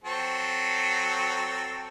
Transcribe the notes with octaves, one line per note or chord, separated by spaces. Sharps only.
F#3 C4 A4